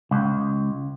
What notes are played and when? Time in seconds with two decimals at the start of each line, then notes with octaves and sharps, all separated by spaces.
0.11 C#2